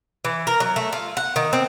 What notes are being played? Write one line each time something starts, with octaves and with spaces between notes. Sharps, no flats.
E3
A#4
F#3
A3
F4
F#5
D#3
C4